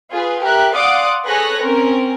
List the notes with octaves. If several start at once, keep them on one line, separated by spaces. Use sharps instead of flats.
F4 G#4 B4
G4 A#4 E5 F#6
D5 F5 F#5 C6 D6 D#6
G#4 A4 B4 C#5 F#6 A#6
C4 C#4 A#4